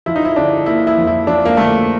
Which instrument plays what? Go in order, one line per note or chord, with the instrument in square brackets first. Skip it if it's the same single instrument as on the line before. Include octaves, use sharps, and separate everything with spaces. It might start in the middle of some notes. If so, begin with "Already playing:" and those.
[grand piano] F3 [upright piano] E4
[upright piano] D#4
E4
[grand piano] D3 [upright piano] D4
[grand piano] A#3 [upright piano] E4
[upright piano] E4
[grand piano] F2
[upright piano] E4
[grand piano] F3 [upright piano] D4
[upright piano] A#3
[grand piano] D3 [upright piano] A3